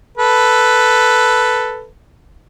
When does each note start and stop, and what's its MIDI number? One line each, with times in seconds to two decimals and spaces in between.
0.17 1.86 69
0.17 1.86 71